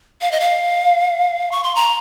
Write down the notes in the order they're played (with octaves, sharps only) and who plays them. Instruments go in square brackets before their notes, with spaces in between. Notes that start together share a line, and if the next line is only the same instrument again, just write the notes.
[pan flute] F5
D#5
F5
C#6
C6
A#5